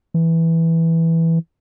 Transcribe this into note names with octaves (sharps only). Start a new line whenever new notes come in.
E3